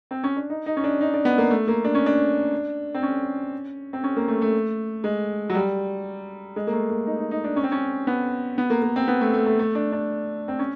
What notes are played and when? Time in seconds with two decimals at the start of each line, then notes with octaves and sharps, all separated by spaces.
0.11 C4
0.23 C#4
0.36 D4
0.50 D#4
0.66 D#4
0.77 C#4
0.84 D4
1.01 D#4
1.14 D4
1.25 B3
1.38 A#3
1.50 A3
1.68 A#3
1.85 D4
1.95 C#4
2.06 D4
2.94 C4
3.03 C#4
3.93 C4
4.04 C#4
4.17 A#3
4.28 A3
4.42 A3
5.04 G#3
5.50 F#3
5.55 G3
6.56 G#3
6.67 A#3
6.72 A3
6.90 A#3
7.07 D#4
7.18 D#4
7.31 D#4
7.44 D4
7.56 C#4
7.63 C4
7.72 C#4
8.07 B3
8.58 B3
8.70 A#3
8.82 A#3
8.96 C4
9.08 B3
9.21 A3
9.34 A3
9.46 A3
9.59 A3
9.75 D4
9.92 D4
10.48 C4
10.59 C#4